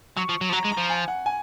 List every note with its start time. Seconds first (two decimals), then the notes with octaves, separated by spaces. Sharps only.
0.17 F#3 C#6
0.29 F3
0.41 F#3
0.49 F3
0.53 F#3 A#5
0.65 G#3
0.72 A#5
0.78 F3
0.90 G#5
1.08 F#5
1.26 G#5